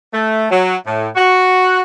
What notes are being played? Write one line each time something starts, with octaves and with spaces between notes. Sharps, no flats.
A3
F#3
A2
F#4